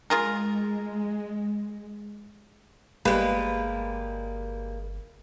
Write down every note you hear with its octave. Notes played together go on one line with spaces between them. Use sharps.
G#3 F4 G#4 A#4
G1 G3 G#3 A#3 B4